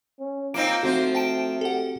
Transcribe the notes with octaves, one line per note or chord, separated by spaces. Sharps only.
C#4
A#3 C4 D#4 F4 D7
F3 A3 C4 F#4 C5
G5 A5 D7
G4 A4 F#5